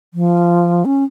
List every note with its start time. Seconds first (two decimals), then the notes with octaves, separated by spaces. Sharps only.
0.14 F3
0.85 C#4